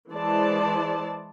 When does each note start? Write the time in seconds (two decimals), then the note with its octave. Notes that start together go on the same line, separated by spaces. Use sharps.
0.12 E3 G#3 C5 D5 A5